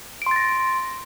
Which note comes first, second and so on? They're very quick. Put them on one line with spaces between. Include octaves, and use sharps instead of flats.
D7 C6 A6 A#6